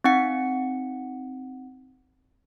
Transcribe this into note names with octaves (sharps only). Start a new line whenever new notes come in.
C4 D#4 F#5 C#7